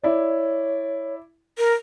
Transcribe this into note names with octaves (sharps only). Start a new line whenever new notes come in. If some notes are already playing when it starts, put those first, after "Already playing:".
E4 C#5 D5
A#4